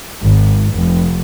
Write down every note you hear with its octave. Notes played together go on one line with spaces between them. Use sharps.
G#1
F1